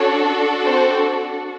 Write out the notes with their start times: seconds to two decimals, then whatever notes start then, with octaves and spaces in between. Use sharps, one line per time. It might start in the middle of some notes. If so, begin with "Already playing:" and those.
Already playing: C#4 D4 F#4 A4 C#5
0.65 C4 C5